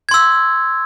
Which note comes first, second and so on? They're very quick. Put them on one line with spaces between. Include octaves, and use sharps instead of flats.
G#6 C6 E6